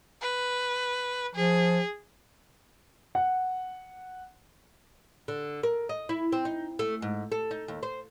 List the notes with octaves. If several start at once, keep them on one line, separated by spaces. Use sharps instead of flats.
B4
F3 G#4
F#5
D3
A#4
D#5
E4
C4
D#4
A3
G#2
A4
D#4
D#2
C5